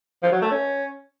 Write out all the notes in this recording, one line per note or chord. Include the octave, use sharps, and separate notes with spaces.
F3
F#3
A3
C#4